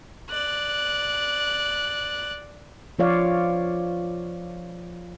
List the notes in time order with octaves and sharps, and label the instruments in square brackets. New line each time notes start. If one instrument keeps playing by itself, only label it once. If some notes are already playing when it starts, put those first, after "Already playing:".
[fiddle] D5 F#6
[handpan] F3 F4 C#5 D5 F5